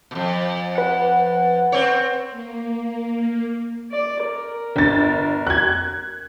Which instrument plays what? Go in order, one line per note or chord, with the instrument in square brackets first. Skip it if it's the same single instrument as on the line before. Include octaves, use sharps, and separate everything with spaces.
[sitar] F2 B2
[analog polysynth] B4 F#5
[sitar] C4 C#5
[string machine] A#3
[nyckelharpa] D5
A#4
[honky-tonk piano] G1 A6
F#6 G#6